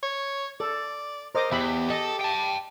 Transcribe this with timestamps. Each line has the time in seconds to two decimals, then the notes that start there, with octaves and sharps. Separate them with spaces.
0.03 C#5
0.60 A4 D5
1.35 A#4 C5 D#5 D6
1.52 E2 G4 E5 B5
1.90 A4 D#5
2.21 G5 A5